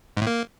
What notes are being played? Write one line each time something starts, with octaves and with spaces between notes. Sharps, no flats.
G#2
A2
A#3